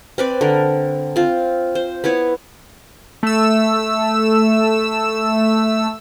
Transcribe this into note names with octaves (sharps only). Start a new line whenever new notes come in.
C4 B4 D5
D3 A#4
C4 F4
C5
B3 E4 B4 C#5
A3 E6